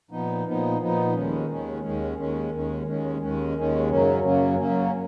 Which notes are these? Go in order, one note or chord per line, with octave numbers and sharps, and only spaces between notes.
A#2 F3 B3 D#4
A#2 F3 B3 D#4
A#2 F3 B3 D#4
D#2 D#3 G#3 C#4
D#2 D#3 G#3 C#4
D#2 D#3 G#3 C#4
D#2 D#3 G#3 C#4
D#2 D#3 G#3 C#4
D#2 D#3 G#3 C#4
D#2 D#3 G#3 C#4
D#2 D#3 G#3 C#4
F#2 C#3 F#3 A#3 C#4
F#2 C#3 F#3 A#3 C#4
F#2 C#3 F#3 A#3 C#4